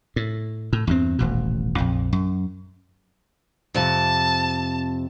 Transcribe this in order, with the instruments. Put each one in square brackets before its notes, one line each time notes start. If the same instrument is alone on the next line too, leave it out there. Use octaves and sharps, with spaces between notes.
[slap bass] A2
A2
E2 G2 C4
D#1 A1 B2
A#1 F2
F#2
[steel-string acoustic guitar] F2 C3 [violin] A5